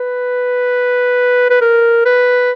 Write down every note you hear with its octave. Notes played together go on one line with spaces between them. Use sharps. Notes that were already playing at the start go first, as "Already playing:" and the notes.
Already playing: B4
B4
A#4
B4